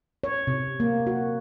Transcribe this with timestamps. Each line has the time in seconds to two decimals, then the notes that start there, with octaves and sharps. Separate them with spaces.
0.24 C#5
0.47 C3
0.80 A#3
1.07 F#4